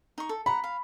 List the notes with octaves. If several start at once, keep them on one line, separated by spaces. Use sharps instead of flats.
D#4 C#6
A4
F#5 A#5 B5
F5